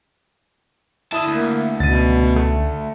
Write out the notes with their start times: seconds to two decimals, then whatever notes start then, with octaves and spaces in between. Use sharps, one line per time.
1.12 D3 E4 A5 D#6
1.27 D2 A#3
1.80 C#2 B2 A6 D#7
2.36 A3